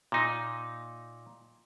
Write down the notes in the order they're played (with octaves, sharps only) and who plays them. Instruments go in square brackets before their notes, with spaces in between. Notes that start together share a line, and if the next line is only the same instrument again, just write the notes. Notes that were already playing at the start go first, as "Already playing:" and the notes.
[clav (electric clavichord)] A#2 D#4